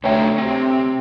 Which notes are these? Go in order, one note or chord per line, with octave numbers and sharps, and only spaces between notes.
D2 C3 A3 C#5 E5 G5 A#5
C3 C4